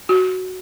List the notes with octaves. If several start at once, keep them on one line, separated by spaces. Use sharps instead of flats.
F#4